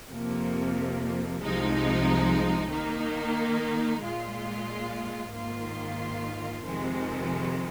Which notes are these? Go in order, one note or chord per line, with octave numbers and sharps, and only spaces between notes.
F2 C3 F3 A#3
C2 C3 F3 G#3 D#4
D#3 A#3 D#4
A#2 G#3 F4
G#2 D#3 A#3 F4
F2 C3 D#3 G#3